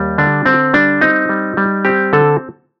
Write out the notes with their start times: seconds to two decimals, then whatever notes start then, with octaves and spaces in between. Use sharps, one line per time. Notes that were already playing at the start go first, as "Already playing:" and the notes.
Already playing: D#2 G3
0.18 D3 D4
0.46 D3 C4
0.73 G3 D4
1.01 C4 D#4
1.29 G3
1.57 G3
1.85 C4 G4
2.13 D3 A4